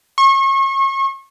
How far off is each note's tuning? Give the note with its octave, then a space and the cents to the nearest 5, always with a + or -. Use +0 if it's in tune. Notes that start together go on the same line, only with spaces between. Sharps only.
C#6 -35